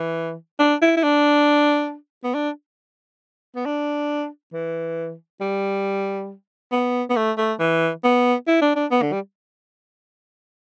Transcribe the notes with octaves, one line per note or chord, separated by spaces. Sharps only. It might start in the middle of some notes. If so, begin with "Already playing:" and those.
Already playing: E3
D4
E4
E4
D4
B3
D4
B3
D4
E3
G3
B3
B3
A3
A3
E3
B3
E4
D4
D4
B3
D3
G3